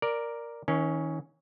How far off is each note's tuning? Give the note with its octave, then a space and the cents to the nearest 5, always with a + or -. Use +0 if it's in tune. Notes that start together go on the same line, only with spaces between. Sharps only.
A#4 +0 D5 +0
D#3 +40 C#4 +0